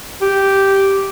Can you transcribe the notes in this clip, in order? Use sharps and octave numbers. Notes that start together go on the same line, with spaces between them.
G4